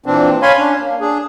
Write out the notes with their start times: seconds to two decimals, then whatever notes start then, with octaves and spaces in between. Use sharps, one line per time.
0.06 A#2 E3 C4 D4
0.42 C#5 F5 G#5 B5 C6
0.58 C#4 D4
0.79 A#3
1.01 D4 G#4